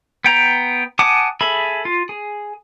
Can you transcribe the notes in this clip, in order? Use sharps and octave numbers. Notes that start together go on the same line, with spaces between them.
B3 G5 A#5
F#5 G#5 A5 D6 D#6
G#4 A4 E5 B5
F4
G#4